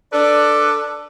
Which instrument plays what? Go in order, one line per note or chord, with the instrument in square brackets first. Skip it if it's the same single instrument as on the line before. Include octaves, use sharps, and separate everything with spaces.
[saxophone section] D4 A4 B4 D5